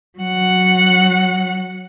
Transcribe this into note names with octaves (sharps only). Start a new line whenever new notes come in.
F#3 F#5